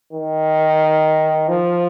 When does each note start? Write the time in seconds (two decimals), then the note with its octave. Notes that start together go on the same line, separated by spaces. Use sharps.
0.13 D#3
1.48 F3